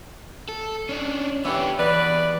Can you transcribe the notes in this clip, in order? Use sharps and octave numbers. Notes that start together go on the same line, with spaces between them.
A4
C#4 D4
E3 B3 D4 G4 C#5
E2 B4 D5